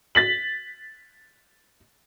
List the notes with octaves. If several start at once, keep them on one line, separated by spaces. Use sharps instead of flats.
A6 B6 F#7